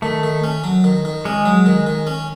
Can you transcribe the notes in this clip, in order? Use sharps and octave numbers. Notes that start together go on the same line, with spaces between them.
D#3 A3
D#3
C#4
F#3
D#3
D#3
G#3 C#4
F#3
D#3
D#3
C#4